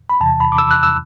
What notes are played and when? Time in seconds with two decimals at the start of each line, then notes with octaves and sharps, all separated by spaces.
0.09 B5
0.20 E2 C3 E3 A5
0.40 B5
0.52 D6
0.58 E6
0.71 F#6
0.83 E6